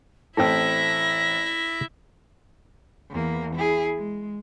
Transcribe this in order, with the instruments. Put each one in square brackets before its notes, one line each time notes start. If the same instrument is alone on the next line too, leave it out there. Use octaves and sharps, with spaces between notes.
[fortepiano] A1 C4 E6 [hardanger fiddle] E4 E5 [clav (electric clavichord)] A4 G5 [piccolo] A#6
[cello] E2 A#3
E4 G#4
G#3